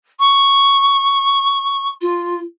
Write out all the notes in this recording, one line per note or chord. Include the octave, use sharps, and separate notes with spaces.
C#6
F4